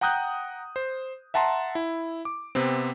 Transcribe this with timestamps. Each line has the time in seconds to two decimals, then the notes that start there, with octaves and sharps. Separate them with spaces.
0.01 F#5 G5 A#5 D#6 F#6 G6
0.76 C5
1.34 E5 F#5 A5 A#5 C6
1.75 E4
2.25 D6
2.55 C3 B3 C4